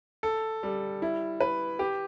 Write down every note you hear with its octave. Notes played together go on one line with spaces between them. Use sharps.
A4
G3
E4
B4
G4